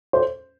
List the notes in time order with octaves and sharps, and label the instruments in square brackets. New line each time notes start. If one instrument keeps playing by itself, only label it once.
[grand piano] C5